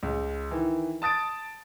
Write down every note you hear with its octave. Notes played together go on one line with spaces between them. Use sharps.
C#2
D#3 E3
A5 D#6 A6 D7